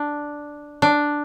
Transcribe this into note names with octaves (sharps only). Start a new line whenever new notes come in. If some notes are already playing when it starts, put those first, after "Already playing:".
Already playing: D4
D4